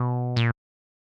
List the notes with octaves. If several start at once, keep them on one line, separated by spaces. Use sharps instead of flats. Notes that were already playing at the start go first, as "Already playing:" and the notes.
Already playing: B2
A#2